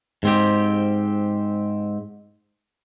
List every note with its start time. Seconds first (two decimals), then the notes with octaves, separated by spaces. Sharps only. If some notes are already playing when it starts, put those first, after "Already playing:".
0.23 G#2 C4 G4